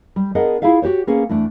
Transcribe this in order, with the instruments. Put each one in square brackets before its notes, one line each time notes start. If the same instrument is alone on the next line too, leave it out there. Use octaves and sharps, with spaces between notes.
[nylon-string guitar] G3
B3 D4 G#4 A#4 D#5 F#5
E4 F4 G#4 E5 F5
F#4 G4 C5 C#5
A#3 B3 C#4 G#4
E2 A3 D4